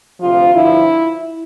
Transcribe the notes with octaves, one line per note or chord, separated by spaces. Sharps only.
D2 C3 F3 F4
G2 D3 F3 E4